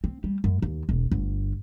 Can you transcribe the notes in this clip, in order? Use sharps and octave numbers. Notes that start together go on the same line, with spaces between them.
C4
G3
F#2
D#2
E1
G1